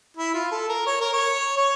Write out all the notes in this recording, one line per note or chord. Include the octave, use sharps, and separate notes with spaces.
E4
F4
A4
A#4
C#5
A#4
C#5
C#5